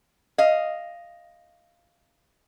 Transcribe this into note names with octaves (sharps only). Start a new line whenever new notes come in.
D#5 F5